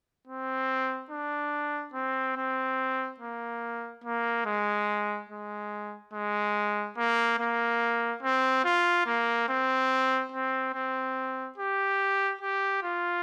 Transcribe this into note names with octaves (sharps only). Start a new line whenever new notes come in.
C4
D4
C4
C4
A#3
A#3
G#3
G#3
G#3
A#3
A#3
C4
F4
A#3
C4
C4
C4
G4
G4
F4